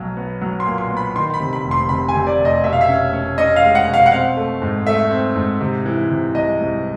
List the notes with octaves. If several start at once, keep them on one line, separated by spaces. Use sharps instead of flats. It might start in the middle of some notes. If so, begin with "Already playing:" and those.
Already playing: B1 F#3
B3
F#3
C6
A#2
C6
B3
B5
D#3 C6
B5
C3
B5
F1
C6
C3 B5
G#5
C3
D5
F1
D#5
B2 E5
F5
E5
C#4
C#4
C#4 D#5
F5
G#3
F#5
B2
F5
F#5
C4 F5
A3
G#2
A3 E5
C4
G#2
C3
E3
C3
C2 D#5
C2